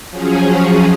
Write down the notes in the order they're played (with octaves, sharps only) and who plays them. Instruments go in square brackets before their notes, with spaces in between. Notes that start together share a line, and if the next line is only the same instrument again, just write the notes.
[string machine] F3 F#3 C#4 G#4